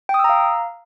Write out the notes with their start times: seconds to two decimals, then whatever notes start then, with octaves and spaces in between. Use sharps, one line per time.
0.09 G5
0.14 D#6
0.19 E6
0.24 A#5
0.29 F5